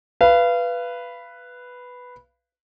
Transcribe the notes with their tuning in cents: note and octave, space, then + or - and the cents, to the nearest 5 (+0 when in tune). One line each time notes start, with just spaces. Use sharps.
B4 +0 F5 -30